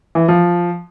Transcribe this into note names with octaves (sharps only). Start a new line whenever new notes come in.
E3
F3